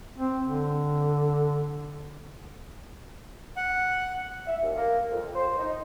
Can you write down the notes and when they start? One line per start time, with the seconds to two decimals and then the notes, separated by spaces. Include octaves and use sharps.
0.18 C4
0.44 D3
3.57 F#5
4.46 E5
4.62 D#2
4.75 A#3
5.11 F2
5.35 C5
5.58 D#4